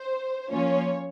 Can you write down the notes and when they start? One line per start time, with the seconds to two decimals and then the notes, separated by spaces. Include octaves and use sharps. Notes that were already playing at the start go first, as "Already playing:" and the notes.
Already playing: C5
0.50 F3 A#3 C#4 F4 C#5